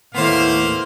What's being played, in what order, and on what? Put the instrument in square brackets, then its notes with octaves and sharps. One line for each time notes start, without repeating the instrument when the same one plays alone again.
[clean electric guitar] D#2 B3 [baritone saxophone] A2 [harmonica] A#3 F5 [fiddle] C5